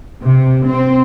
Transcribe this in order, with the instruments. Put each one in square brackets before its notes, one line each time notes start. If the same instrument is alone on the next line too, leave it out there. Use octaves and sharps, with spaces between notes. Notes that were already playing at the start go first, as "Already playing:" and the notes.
[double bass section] C3
C4